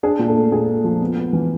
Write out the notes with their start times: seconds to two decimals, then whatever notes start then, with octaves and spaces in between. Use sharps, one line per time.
0.03 D4 G#4
0.19 A#2
0.28 A4
0.36 A3
0.52 A#2 G#4
0.68 A3
0.84 F3
1.01 B3
1.16 B3
1.33 E3